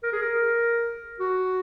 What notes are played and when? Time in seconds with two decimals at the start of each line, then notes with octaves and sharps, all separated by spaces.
0.03 A#4
0.13 G#4
0.22 A#4
1.20 F#4